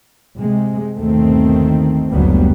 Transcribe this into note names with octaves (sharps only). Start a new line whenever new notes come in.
C3 G#3
G1 D#2 B2 D#3 A3 C4
F#1 D2 F#3 G3 A#3 B3